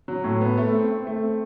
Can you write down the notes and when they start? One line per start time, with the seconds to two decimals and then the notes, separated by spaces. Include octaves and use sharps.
0.08 F#3
0.24 A2
0.41 B3
0.58 A3
0.74 C4
0.89 C4
1.07 A3
1.23 C4